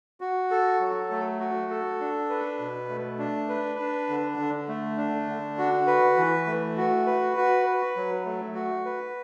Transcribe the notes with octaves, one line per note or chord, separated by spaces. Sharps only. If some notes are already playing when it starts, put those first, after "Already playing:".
F#4
A4
F#3
A3
F#4
A4
D4
B4
B2
A3
D4
B4
D4
D3
D3
A3
D4
D3
F#4
B4
E3
A3
F#4
B4
F#4
B4
F#3
A3
F#4
B4